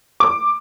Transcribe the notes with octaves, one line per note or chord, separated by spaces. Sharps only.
D6